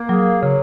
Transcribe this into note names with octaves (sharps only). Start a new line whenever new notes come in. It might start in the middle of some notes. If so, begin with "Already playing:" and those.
Already playing: A#3
F#3 G#4
C#3 F#3